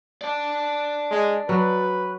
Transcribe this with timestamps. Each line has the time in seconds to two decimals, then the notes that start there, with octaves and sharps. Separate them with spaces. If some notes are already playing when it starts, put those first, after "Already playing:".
0.21 D5 A5
1.10 G#3
1.49 F#3 B4